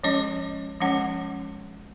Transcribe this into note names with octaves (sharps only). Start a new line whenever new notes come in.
F3 G#3 C#4 D#5
F3 G#3 C#4 F#5